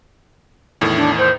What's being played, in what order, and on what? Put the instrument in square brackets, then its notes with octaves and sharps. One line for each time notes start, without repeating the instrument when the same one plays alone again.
[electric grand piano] E2 A2 D#3
[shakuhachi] D4
C5